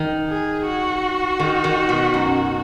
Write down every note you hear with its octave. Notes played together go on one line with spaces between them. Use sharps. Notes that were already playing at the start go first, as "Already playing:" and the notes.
Already playing: D#3
G#4
F#4
D#3
D#3
B2
F#2